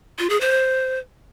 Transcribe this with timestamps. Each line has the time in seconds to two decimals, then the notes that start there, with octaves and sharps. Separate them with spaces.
0.19 F4
0.30 G#4
0.41 C5